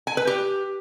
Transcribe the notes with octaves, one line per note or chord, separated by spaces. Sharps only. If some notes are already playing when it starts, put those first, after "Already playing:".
G#5
B4
G4